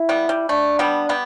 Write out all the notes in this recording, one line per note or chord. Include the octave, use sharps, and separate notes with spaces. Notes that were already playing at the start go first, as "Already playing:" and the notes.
Already playing: E4
G3 B3
G3
A3 D4
G3 B3
G3 B3